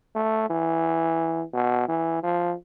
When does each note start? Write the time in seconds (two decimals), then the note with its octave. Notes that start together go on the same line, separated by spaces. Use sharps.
0.15 A3
0.50 E3
1.53 B2
1.88 E3
2.23 F3